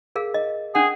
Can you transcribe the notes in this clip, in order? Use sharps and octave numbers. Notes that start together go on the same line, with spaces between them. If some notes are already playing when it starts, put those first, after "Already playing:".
G#4 A#4 F5
D#5
C#4 D4 G#4 F#5